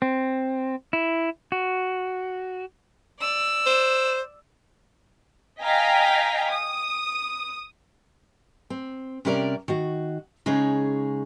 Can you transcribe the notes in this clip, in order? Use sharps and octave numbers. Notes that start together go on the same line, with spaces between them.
C4
E4
F#4
D5 E6
C5
D#5 F5 G5 G#5 A#5 B6
D#6
C4
C3 G3 C#4 A#4 D5
D#3 F#4
C#3 G#3 D#4 G#4 C#5